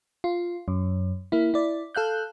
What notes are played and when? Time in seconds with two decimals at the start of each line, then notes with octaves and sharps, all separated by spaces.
0.24 F4
0.68 F#2
1.32 A#3 E4
1.54 E4 D5
1.95 A4 F5 F#6 G6